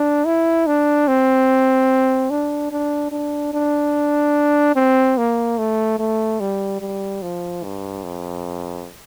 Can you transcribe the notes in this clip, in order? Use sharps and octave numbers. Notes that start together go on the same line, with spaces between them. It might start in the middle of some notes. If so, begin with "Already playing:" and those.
Already playing: D4
E4
D4
C4
D4
D4
D4
D4
C4
A#3
A3
A3
G3
G3
F3
G2
F2